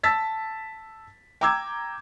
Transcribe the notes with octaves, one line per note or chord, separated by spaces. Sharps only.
A5 E6 A6 B6
G5 A#5 D6 E6 G#6